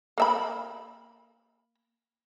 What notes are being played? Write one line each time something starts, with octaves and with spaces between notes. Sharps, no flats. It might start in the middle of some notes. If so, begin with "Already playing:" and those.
A#3 E5 B5